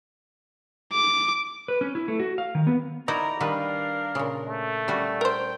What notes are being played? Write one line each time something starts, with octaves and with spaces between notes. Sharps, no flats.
D6
B4
C#4
E4
A3
F#4
F5
D#3
B3
D#4 E4 F#4 A#4 D5 A#5
D#3 G3 D4 A#4 B4 F5
A#2 C#3
A3
G3 C#4 F#4
A#4 C5 G5